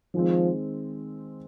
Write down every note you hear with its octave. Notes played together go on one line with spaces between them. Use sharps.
D#3 F3 G#3 C4